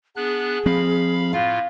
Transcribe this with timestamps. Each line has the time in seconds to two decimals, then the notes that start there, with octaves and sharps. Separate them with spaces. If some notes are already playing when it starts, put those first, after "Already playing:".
0.16 B3 D4 G#4 F#6
0.66 F3 C4 F5 B5
1.33 A2 F4 F5